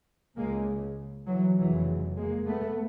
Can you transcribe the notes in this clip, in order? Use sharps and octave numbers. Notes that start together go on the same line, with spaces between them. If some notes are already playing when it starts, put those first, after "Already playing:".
C#2 C#3 G#3 A#3
E3 F#3
F1 E2 C#3 E3 F#3
G#3 A#3
A3 B3